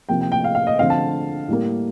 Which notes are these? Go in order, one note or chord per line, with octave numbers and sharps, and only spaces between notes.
C3 F3 A#3 G5
G5
G5
F5
F5
D#5
D3 F3 C4 F5
A5
A2 G3 A#3